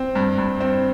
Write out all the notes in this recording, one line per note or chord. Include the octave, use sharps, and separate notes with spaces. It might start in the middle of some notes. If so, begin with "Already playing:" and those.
Already playing: C4
G2
G2
C4